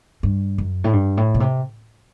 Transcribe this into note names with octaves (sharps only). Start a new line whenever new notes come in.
G2
F#2
A2
G2
A2
B2
C3